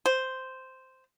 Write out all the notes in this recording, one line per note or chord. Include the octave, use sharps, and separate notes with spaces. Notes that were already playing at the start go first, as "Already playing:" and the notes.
C5